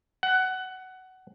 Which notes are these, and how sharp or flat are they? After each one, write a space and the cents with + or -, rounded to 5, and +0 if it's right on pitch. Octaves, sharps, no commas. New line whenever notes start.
F#5 +15